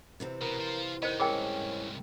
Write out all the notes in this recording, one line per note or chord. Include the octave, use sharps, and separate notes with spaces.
C3 E3 C4
B2 A#4
F4 C5
D#3 B3 D#4 C5 D#5
C2 G#2 C#4 G#4 A#4 G5